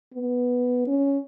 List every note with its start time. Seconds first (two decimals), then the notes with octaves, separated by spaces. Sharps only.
0.14 B3
0.87 C#4